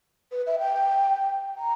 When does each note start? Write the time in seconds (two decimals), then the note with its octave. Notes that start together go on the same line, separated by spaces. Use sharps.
0.32 B4
0.46 E5
0.59 G5
1.57 A#5